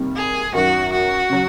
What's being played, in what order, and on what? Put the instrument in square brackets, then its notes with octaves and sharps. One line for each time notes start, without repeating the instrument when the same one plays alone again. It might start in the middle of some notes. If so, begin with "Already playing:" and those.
Already playing: [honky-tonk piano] C3 D#3 G3 A#3
[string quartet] G#4
[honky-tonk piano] F#2 D#3 F#3 [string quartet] F#4
[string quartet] F#4
[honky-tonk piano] C#3 F#3